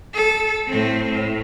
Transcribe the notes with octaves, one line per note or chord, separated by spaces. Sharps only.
A4
A2 C4
A2